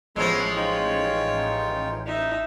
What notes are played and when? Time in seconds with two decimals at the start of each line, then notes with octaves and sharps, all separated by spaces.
0.16 A1 F3 G#3 A3 B3 A4 C#5
0.57 D#4 F4 G5
2.06 D#4 E5